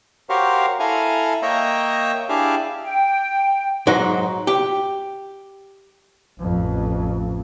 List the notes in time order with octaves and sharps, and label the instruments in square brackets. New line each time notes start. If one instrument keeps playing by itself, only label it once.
[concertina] F#4 G4 A#4 C5 C#5 F5
E4 A4 F5 G#5 A#5
A#3 C#5 D#5 E5 G5 A#5
D4 E4 G4 G#4 E5 F5
[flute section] G5
[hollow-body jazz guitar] G#2 F#3 D#4
G4
[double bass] A1 F2